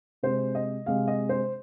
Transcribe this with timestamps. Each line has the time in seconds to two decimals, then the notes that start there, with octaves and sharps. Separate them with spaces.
0.23 C3 G#3 C5
0.55 D#5
0.86 C3 G#3 F5
1.08 D#5
1.29 C5